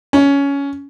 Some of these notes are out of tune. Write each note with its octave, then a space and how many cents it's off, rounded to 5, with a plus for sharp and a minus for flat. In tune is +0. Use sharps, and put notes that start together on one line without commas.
C#4 +15